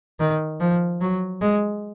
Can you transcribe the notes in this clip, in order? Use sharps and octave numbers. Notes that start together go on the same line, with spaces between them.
D#3
F3
F#3
G#3